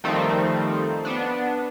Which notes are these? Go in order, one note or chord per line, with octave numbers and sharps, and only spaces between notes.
D#3 F3 G3 A3 C4 D#4
B3 D4